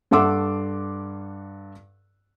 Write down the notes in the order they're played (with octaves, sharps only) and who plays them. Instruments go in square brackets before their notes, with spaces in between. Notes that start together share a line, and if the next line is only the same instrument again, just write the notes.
[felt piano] G2 A4 F#5 C6 D6 E6